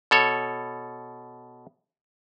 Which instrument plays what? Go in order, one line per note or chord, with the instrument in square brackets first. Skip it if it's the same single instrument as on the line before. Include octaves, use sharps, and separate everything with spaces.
[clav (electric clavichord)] B2 A4 C#5